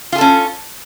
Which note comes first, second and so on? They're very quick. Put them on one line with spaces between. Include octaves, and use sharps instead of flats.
F4 G#4 A4 C#4